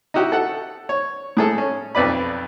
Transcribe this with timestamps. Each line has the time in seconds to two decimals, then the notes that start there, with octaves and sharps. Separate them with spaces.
0.14 D#4 E4 F#4 G4
0.32 A4 F#5
0.89 C#5
1.37 A2 G#4 A4
1.58 C#4
1.95 B1 F2 B4 D5 B5